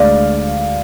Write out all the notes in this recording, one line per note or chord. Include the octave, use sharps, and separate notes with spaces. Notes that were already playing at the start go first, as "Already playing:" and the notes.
Already playing: D2 D3 G#3 D5 F5